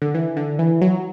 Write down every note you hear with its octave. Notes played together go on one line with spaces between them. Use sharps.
D3
E3
D3
E3
F#3